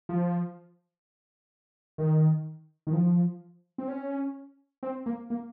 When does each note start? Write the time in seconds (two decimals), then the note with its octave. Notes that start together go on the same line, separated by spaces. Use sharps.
0.09 F3
1.98 D#3
2.87 D#3
2.93 F3
3.78 C4
3.88 C#4
4.83 C4
5.06 A#3
5.30 A#3